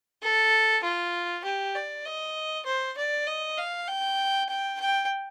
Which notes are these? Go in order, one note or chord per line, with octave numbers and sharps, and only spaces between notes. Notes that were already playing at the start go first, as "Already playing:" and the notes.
A4
F4
G4
D5
D#5
C5
D5
D#5
F5
G5
G5
G5